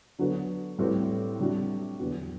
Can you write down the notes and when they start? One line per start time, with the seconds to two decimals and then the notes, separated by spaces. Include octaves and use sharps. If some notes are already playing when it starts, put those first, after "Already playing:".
0.19 D3 F#3 B3 F#4 B4
0.78 A2 G3 C4 F#4 B4
1.39 C3 G3 D4 F#4
1.99 E2 D3 F#3 B3 F#4